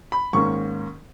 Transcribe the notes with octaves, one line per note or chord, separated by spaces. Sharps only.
B5
G#2 D#3 A#3 C#4 C#6